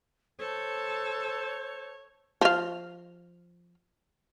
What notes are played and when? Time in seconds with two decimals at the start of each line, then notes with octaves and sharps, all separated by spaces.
0.39 A4 C5 C#5
2.41 F3 F5